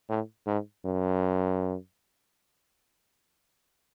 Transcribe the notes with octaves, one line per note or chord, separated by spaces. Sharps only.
A2
G#2
F#2